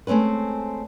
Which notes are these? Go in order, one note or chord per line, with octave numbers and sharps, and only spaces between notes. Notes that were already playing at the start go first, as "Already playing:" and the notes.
G#3 A3 C4 C#4 B4